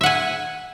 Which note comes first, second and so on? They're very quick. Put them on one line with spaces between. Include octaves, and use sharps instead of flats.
E5 F#5 G#5